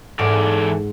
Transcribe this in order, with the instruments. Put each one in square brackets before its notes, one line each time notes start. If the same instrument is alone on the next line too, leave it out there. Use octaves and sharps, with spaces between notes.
[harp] G#2 [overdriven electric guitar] E3 D5 [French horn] A4